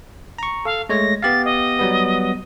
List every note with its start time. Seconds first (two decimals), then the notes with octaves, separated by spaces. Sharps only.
0.38 A#5 C#6
0.65 A4 F5
0.89 G#3 A3 C#5 A#6
1.23 B3 G4 F5 A6
1.45 D#5
1.79 F#3 G3 B3